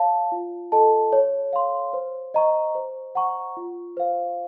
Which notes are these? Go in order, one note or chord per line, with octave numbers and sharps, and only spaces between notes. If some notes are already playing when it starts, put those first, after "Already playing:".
Already playing: C#5 F5 A5
F4
A4 D#5 A5
C#5
F5 C6
C5
D#5 A#5 C#6
C5
F#5 A#5 C#6
F4
C5 F5